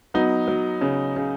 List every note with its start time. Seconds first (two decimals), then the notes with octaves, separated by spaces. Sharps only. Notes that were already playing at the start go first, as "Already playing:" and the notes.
0.14 F#3 B3 D#4
0.48 F#3
0.81 C#3
1.16 C#3